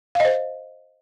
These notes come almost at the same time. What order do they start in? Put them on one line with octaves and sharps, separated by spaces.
F5 D#5 C5